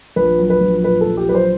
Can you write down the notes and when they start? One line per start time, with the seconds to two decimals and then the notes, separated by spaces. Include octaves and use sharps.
0.16 A#1 B4
0.39 F#3
0.50 B4
0.61 A#1
0.83 A#2 B4
1.01 A4
1.06 A#1
1.17 G4
1.28 F#3 B4
1.34 C5